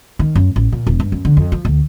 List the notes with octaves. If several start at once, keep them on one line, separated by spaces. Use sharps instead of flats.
D#3
F#2
A1
A#2
E1
G2
F#2
D3
F2
F3
D2